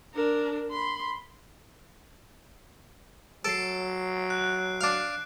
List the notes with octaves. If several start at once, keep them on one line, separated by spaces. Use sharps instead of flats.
D4 A#4
B5 C6
F#3 A4 C7 D7
F#6
D4 F5